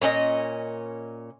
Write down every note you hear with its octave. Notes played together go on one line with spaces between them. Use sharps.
A#2 C#4 D4 D#5